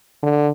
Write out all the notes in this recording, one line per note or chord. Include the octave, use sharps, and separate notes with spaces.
D3